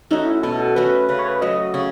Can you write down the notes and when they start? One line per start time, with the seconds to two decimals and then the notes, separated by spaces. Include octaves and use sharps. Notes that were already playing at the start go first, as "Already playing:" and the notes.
0.11 A3 C#4 D#4 F#4
0.26 E4
0.43 B2 A4
0.76 A3 C#4 F#4 B4
1.09 C#3 B4
1.19 C#5
1.28 B4
1.41 F#3 A3 D#5
1.74 C#3 C#5